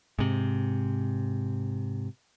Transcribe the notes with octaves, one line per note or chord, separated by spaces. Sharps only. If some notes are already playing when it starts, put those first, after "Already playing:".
G#2 C3